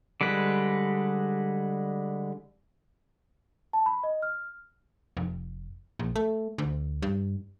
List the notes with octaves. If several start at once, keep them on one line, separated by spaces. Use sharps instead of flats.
D3 G3 G#3 B4
A5
B5
D#5
F6
F1
A#1
A3
D2
G2